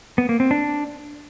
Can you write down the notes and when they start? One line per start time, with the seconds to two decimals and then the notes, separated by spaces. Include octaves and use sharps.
0.18 B3
0.29 A#3
0.40 C4
0.51 D4